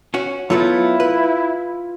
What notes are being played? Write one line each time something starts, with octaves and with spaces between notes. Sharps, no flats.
C#4 F#4
F#3 A3 B3 E4 F4
B4